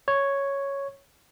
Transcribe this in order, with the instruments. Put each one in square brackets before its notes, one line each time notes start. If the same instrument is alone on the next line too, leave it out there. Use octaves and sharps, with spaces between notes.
[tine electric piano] C#5